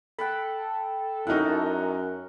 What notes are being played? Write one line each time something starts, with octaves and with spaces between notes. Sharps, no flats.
A4 F#5 G5 B5
F#2 D#4 E4 F#4 A#4 F#5